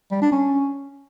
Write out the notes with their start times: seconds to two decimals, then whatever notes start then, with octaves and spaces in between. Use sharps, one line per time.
0.12 G3
0.22 D4
0.32 C#4